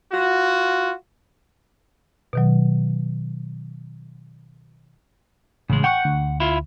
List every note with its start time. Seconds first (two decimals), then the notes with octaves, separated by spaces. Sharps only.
0.12 F4 F#4
2.33 B2 D#3 F#3
5.70 A1 C#3 G#3
5.84 F#5 G5 C#6 F#6
6.05 D2
6.40 E4 F4